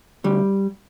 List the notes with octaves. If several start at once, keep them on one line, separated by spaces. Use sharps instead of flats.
D2 G3